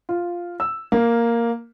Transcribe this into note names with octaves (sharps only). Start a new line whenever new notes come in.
F4
E6
A#3